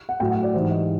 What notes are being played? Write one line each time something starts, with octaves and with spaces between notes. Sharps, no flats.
F#5
A2 F#3 G5
F#5
D5
G#2 E3 G3 C5
D#5